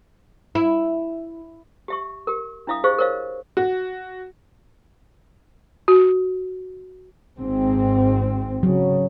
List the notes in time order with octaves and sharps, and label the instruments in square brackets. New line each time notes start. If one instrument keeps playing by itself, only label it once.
[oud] E4
[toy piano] G4 E5 C#6
G4 A#4
D4 E4 E5 F5 D#6
G4 G#4 C5 D#5 F5 C#6
A#4 C5 C#5 D#5 F5
[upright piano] F#4
[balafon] F#4
[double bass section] G#1 G#2 C4
[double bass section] C#3 [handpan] F#3